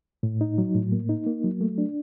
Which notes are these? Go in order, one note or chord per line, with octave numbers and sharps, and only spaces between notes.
A2
D#4
F#3
A2
A#3
D#4
A#3
F#3
A3
D4